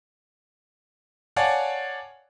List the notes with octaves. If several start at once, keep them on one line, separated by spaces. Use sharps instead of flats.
C#5 D5 F5 F#5 G#5 A5